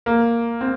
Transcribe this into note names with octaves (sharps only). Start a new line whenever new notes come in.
A#3
C4